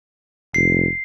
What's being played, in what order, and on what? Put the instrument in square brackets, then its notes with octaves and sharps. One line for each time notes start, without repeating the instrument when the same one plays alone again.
[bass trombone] F1 [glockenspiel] C7